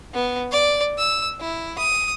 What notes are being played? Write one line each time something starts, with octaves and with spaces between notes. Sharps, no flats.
B3
D5
E6
E4
D#6